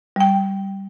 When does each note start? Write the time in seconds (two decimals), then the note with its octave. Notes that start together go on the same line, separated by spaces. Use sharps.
0.16 G3 G5